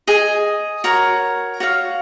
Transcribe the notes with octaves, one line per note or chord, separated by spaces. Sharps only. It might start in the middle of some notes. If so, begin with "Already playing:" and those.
G#4 D#5 G#5
F#4 A#4 C#5
F#4 C#5 F5